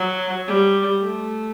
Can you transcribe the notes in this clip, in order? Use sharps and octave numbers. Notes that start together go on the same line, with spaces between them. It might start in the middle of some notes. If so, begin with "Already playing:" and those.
Already playing: F#3
G3
A3